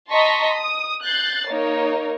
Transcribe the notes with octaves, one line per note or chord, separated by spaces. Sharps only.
D#5 A5 A#5 C6 C#6 B6
D#6
F#6 G6 A6 C7
A#3 D#4 A#4 C#5